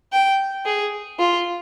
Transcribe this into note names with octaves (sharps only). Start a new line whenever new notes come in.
G5
G#4
F4